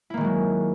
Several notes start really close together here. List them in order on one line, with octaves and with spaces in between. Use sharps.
E4 A#3 D#3 G#3 F#3